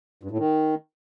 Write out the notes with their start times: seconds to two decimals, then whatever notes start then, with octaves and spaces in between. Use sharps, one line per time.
0.23 G2
0.31 A2
0.38 D#3